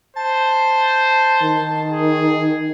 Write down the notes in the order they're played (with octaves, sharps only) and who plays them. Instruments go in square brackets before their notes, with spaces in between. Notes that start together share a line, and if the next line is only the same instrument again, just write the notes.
[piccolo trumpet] C5 [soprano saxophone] A5
[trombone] D#3
[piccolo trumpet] G#4